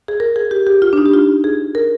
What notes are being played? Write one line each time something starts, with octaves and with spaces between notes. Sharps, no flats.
G#4
A#4
G#4
G4
G4
F4
D4
D#4
G4
F4
G#4
A#4